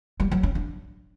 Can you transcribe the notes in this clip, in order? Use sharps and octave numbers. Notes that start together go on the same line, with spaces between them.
G3
F#3
C#4
D4